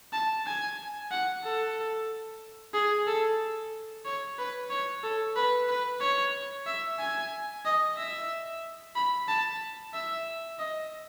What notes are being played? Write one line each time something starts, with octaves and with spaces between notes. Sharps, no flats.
A5
G#5
F#5
A4
G#4
A4
C#5
B4
C#5
A4
B4
B4
C#5
E5
G#5
D#5
E5
B5
A5
E5
D#5